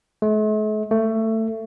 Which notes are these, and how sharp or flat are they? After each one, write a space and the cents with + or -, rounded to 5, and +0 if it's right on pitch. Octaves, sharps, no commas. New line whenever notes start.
A3 -45
A3 +20